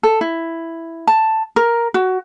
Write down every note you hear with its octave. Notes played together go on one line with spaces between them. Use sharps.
A4
E4
A5
A#4
F#4